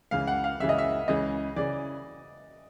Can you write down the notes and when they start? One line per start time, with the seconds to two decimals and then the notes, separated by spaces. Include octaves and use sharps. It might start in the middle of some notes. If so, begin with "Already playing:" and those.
0.11 C#2 C#3 E3 F5
0.27 F#5
0.44 F5
0.60 C#2 C#3 E3 E5
0.69 D#5
0.78 E5
1.08 C#2 C#3 E3 D#5
1.56 C#3 E3 D5